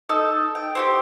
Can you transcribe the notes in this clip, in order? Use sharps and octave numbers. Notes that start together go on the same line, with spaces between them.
D#4 A4 E6
G5
C4 F#4 G4